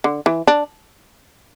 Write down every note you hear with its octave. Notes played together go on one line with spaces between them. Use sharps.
D3
E3
D4